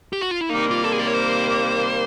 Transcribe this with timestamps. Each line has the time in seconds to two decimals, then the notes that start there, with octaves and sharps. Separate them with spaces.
0.13 G4
0.22 F#4
0.31 F4
0.41 E4
0.49 C3 D#3 G3 A#3 D#4
0.71 F4
0.84 A4
0.92 G#4
0.99 D5
1.07 C#5
1.14 C5